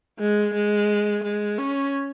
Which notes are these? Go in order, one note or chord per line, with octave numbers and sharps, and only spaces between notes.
G#3
G#3
G#3
C#4